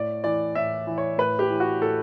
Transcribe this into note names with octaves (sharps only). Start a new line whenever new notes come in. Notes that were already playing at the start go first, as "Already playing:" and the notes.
Already playing: A2 D5
E3 D5
A2 E5
E3
C#5
A2 B4
G4
E3
F#4
A2 A4